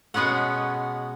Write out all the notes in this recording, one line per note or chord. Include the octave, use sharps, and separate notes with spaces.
B2 G#3 B3 C#4 F#5